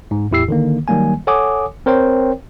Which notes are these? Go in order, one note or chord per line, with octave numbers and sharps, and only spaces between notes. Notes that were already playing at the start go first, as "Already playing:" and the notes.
G#2
E2 A2 E4 G4 E6 C7
D3 D#3 A#3
D#3 F#3 G3 A#3 G#5
A4 C#5 F#5 G#5 D6 D#6
C4 A#4 C5 C#5 G5